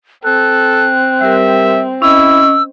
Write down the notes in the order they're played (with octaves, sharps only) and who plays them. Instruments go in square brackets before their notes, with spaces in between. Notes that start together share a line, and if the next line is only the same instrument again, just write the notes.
[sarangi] C4 [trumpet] A4 [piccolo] F#6
[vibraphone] G3 G4 A#4 [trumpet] E5
[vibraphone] C#4 D#5 [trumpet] E4 [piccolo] E6